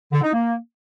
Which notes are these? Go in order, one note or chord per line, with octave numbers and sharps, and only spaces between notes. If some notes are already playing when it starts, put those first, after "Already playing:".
D3
D#4
A#3